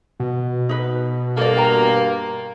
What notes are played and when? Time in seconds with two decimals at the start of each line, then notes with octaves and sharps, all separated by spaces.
0.20 B2
0.69 D#4 B4
1.37 G2 A#3 A4 D5
1.55 A#4 G5 A#5